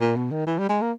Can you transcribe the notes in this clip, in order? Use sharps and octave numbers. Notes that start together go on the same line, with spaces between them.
A#2
B2
D#3
E3
G3
G#3
A#3